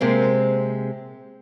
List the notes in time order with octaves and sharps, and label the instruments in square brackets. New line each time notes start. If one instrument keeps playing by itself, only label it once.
[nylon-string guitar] C3 G#3 A#3 C4